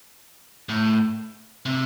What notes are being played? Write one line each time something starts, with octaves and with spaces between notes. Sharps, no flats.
A2
C3